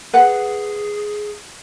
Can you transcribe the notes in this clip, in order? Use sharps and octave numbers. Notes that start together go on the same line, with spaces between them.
G#4 B4 F#5